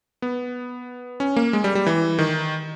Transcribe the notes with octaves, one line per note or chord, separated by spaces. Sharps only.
B3
C#4
A#3
G#3
G3
G3
E3
D#3